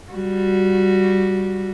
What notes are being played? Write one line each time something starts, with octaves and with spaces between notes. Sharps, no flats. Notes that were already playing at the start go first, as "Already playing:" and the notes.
G3 F#4